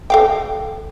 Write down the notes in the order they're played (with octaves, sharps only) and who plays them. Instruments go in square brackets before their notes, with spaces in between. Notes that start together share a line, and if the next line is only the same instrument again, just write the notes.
[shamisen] A4 F5 G5